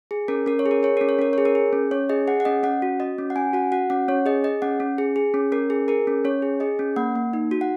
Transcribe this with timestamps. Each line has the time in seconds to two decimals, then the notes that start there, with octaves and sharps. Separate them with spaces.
0.11 G#4
0.28 C#4 A#4
0.46 C#4 A#4
0.59 C#5
0.66 G#4
0.71 A#4
0.83 G#4 C#5
0.97 C#4 A#4
1.09 C#5
1.19 C#4 A#4
1.33 G#4 C#5
1.45 A#4
1.55 G#4
1.73 C#4
1.91 C#4 C#5
2.09 G#4 D#5
2.27 G#4 F#5
2.40 F#5
2.45 C#4 D#5
2.63 C#4 F#5
2.82 F#4
3.00 F#4 D#5
3.18 C#4
3.30 F#5
3.36 C#4 G#5
3.53 F#4 F#5
3.72 F#4 F#5
3.90 C#4 F#5
4.08 C#4 C#5
4.26 G#4 D#5
4.44 G#4 D#5
4.62 C#4 F#5
4.80 C#4
4.98 G#4
5.16 G#4
5.34 C#4
5.52 C#4 A#4
5.70 G#4
5.88 G#4 A#4
6.07 C#4
6.25 C#4 C#5
6.42 G#4
6.60 G#4 D#5
6.79 C#4
6.96 A#3 F#5
7.15 A#3
7.33 D#4
7.51 F#4
7.61 F#5